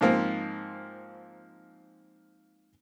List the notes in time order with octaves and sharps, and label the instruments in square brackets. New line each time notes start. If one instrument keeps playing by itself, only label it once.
[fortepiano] G#2 F3 A#3 C4